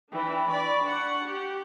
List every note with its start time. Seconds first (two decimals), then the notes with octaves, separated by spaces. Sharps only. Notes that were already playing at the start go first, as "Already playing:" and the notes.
0.13 E3 D4 G5
0.48 D5 B5 C#6
0.84 D4 F#5
1.24 G4